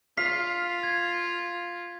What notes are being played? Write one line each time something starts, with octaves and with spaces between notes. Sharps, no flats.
F4 F5 B6
G#6